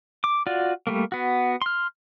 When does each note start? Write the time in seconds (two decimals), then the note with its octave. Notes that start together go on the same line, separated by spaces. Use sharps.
0.24 D6
0.47 F4 F#4 D5
0.87 G3 A3 A#3
1.12 B3 F#4
1.62 C6 F6